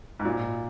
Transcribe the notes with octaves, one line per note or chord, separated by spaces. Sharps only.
G#2
A#2